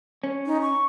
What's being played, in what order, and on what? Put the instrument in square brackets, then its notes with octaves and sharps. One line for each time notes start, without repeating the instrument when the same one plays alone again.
[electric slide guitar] C#4
[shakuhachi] D#4
C#6